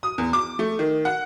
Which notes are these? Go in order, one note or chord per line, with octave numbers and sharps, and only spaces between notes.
D#6
E2
D6
A3
D#3
F#5